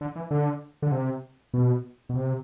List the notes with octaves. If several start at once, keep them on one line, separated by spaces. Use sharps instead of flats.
D3
E3
D3
D3
C3
B2
B2
C3